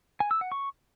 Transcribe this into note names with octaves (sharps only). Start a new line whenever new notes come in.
G#5
E6
F#5
C#6